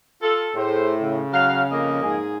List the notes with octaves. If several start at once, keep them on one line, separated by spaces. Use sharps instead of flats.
F4 A4
A2 G#4 A4 C5
C#3
F#3 F5
F2 A#3 D#5
G#2 G#4